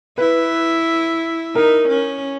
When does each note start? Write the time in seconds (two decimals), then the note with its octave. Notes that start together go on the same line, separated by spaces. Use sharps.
0.18 E4 B4
1.56 D#4 A#4
1.89 C#4